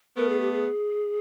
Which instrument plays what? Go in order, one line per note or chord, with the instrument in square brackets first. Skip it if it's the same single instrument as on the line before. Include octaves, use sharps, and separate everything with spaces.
[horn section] A3 B3 [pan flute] A#4
[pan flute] G#4
G4
G#4